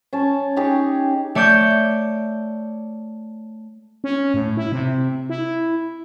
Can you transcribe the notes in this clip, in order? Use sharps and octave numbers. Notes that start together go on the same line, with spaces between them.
C#4 A5
C#4 D#4 G4 G#4
A3 C#5 D5 G6
C#4
A2
E4
C3
E4